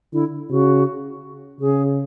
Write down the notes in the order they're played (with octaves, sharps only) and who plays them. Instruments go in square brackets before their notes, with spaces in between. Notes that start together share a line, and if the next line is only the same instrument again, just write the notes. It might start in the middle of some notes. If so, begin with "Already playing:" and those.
[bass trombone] D3 [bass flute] E4
[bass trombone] C#3 [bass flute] F#4
[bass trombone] C#3 [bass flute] G#4